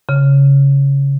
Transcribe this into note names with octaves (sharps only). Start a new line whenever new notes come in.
C#3